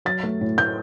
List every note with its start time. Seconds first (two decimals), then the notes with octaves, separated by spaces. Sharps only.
0.05 F#3 A6
0.23 A3
0.41 A2
0.58 A2 G6